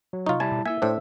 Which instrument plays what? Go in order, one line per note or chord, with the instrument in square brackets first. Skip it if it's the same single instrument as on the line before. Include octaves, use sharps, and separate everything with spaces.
[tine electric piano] F#3
[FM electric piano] C3 C#6 [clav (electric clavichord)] D#4 F4
[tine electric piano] G3 E4 A5 [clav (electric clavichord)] G#5
[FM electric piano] B2
[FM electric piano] A#3 E4 [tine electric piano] E5 E6 [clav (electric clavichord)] G#5
[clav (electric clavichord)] A2 D4 [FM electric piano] C5 G5